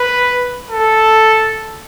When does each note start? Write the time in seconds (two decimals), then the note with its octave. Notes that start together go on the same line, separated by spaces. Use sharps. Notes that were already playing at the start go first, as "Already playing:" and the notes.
Already playing: B4
0.71 A4